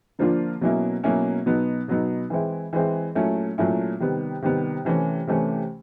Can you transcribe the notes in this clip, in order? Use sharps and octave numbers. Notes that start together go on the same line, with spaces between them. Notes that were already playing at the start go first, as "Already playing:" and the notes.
D3 F3 A#3 D4 F4
B2 F#3 A#3 C#4 E4
B2 F#3 A#3 C#4 E4
B2 F#3 B3 D#4
B2 F#3 B3 D#4
E3 G#3 C4 E4
E3 G#3 C4 E4
A#2 F#3 A3 C#4 E4
A#2 F#3 A3 C#4 E4
C3 D#3 G3 B3
C3 D#3 G3 B3
C3 E3 A3 C#4
C3 E3 A3 C#4